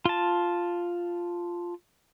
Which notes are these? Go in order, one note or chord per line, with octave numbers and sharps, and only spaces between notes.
F4 A5